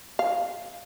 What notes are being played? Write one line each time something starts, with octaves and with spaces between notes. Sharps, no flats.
F5